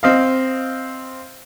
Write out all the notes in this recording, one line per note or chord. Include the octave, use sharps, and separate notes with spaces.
C4 D#5 F5